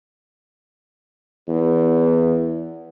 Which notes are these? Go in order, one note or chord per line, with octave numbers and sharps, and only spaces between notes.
E2